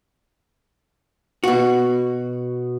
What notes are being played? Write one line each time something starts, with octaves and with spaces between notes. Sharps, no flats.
B2 F#4